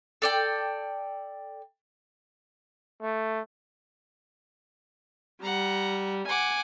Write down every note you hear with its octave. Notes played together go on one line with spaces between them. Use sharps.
A4 D5 G5
A3
G3 F#5 A#5
F#5 G#5 D6